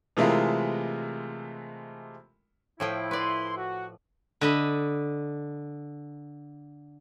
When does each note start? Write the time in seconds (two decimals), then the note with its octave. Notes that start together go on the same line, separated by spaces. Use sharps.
0.17 C3 E3 G#3 A3 F4 A#4
2.80 A2 F3 E4 G5
3.11 B4 D5 C6
3.57 F#4
4.41 D3 D#5 B5